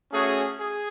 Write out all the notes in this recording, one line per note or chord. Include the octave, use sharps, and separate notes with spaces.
A3 C#4 F#4 G#4
G#4